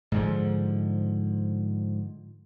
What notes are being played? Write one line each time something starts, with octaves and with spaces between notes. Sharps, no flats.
G#2 D3 F3